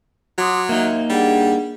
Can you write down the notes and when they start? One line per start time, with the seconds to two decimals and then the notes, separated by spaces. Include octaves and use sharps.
0.38 F#3 C6 D6 D#6
0.69 A#3 D#4 E5
1.10 G3 D4 G#4 F#5